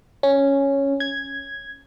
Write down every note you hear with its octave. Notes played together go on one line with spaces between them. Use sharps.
C#4
G#6